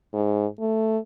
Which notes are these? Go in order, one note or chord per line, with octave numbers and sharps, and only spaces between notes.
G#2
A3